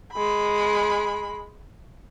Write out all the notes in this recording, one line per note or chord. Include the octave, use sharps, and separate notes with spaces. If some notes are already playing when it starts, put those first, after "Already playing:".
G#3 B5